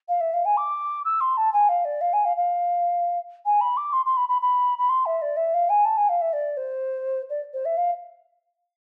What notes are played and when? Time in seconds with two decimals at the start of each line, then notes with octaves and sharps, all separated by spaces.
0.09 F5
0.21 E5
0.34 F5
0.45 G#5
0.57 D6
1.05 E6
1.21 C6
1.37 A5
1.53 G#5
1.69 F5
1.85 D5
2.01 F5
2.13 G#5
2.25 F5
2.37 F5
3.46 G#5
3.61 B5
3.77 D6
3.93 C6
4.06 C6
4.17 B5
4.29 B5
4.42 B5
4.78 B5
4.89 C6
5.06 E5
5.22 D5
5.37 E5
5.54 F5
5.69 G#5
5.85 A5
5.97 G#5
6.09 F5
6.21 E5
6.33 D5
6.57 C5
7.30 D5
7.54 C5
7.65 E5
7.77 F5